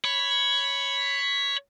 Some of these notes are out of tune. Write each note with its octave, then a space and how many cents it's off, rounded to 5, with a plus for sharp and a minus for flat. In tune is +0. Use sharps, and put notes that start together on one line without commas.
C#5 +0 B5 +10